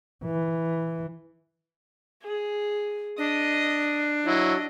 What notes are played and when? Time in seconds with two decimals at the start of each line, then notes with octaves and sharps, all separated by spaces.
0.24 E3
2.23 G#4
3.18 D4 D#5 D#6
4.26 F#3 E4 D#5